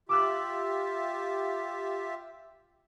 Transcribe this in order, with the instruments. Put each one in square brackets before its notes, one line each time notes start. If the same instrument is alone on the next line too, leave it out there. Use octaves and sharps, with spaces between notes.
[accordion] F4 G4 E5 [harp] D6 E6 F#6